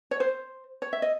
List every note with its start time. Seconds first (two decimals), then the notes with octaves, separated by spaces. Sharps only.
0.11 C#5
0.20 C5
0.82 C#5
0.93 E5
1.02 D#5